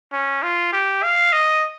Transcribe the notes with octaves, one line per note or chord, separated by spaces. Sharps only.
C#4
F4
G4
F5
D#5